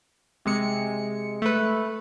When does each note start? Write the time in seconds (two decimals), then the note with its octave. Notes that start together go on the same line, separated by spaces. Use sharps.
0.45 C3 G#3 C#7
1.42 A3 B4